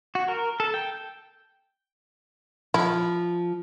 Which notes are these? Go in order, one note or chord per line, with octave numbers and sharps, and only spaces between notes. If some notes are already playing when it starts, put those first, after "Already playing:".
F#4
A#4
A4
G5
F3 E4